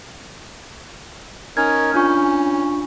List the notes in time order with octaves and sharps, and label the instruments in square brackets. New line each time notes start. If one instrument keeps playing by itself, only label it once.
[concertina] C#4 D#4 A#4 [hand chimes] G#6
[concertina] C#4 [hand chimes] D4 F4 C#6